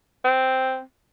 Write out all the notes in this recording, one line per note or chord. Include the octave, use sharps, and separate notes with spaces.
C4